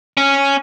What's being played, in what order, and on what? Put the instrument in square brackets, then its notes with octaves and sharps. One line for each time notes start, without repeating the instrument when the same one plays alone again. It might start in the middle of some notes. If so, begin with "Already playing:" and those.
[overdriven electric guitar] C#4